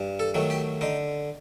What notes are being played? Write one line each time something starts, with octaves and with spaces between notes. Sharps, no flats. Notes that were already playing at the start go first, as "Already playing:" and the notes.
Already playing: G2
A4
D#3 F#3 A3
G4
D3 D#4